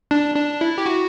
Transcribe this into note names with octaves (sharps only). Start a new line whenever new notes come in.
D4
D4
E4
G4
F#4